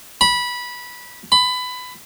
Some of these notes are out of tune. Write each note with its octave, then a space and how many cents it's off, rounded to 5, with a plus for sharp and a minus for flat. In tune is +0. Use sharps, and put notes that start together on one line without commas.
B5 -15
B5 +20